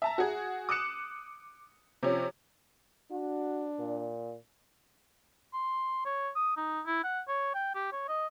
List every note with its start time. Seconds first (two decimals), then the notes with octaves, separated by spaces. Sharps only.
0.02 E5 A5 A#5
0.18 F#4 G#4
0.69 D6 D#6 F#6 C#7 E7
2.03 C3 F3 C#4
3.11 D4 F#4
3.79 A#2
5.54 C6
6.06 C#5
6.36 D#6
6.57 D#4
6.86 E4
7.04 F#5
7.28 C#5
7.55 G5
7.75 G4
7.93 C#5
8.09 D#5